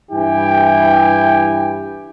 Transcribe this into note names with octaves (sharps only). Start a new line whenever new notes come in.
G2 E3 E4 G4 G5 G#5